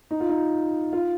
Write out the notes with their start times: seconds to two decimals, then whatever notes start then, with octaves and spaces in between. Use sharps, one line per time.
0.11 D#4
0.20 F4
0.29 D#4
0.93 F4